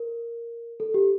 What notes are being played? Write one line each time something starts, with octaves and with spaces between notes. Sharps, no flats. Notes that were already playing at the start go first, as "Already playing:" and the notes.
Already playing: A#4
A4
G4